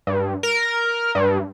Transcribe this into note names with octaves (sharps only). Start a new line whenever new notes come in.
G2
A#4
G2